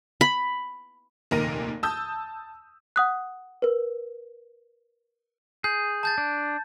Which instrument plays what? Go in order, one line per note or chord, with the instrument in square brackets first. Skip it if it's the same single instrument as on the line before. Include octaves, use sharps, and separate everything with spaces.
[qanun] B5
[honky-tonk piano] F1 D#2 A#2 A#4 A#6 D#7
A5 D#6 E6 G6
[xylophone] F#5 D#6 F#6
A#4 B4
[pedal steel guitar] G#4 [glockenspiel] G6
[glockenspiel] A5 G6 A6
[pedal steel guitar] D4